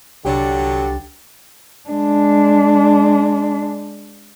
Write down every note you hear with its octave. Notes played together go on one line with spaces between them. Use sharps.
C2 D3 F#3 D4 G4 A6
G#3 D4